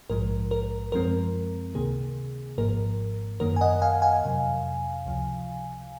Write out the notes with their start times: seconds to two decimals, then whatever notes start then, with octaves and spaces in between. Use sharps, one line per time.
0.10 A#1 G#2 F3 G#3 A#4
0.51 A#4
0.92 F#2 F3 G#3 C4 A#4
1.74 C#2 C3 D#3 A#3 G#4
2.58 G#1 G#2 F3 A#3 A#4
3.40 F#2 D#3 A#3 A#4
3.56 G#5
3.61 D#5 F#5
3.82 F5 G#5
4.02 F5 G#5
4.22 F2 C3 F#3
5.06 C#2 C3 F3